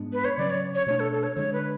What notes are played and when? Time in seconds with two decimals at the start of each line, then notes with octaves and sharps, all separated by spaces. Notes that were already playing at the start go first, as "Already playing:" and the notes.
Already playing: G#2 G#3 B3 D4
0.13 B4
0.25 C#5
0.38 C#3 F#3 C#4 D5
0.50 C#5
0.75 C#5
0.86 B2 A3 D4 C#5
1.00 A4
1.12 A4
1.23 C#5
1.36 D3 G#3 D4 C#5
1.53 B4